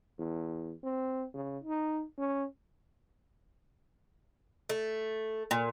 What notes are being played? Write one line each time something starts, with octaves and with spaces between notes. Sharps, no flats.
E2
C4
C#3
D#4
C#4
A3
A#2